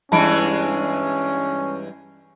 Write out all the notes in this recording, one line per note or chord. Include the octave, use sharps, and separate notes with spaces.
G2 E3 G#3 C#4 A5 B5 D7